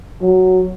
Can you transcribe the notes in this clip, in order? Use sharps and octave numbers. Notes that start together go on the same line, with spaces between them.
F#3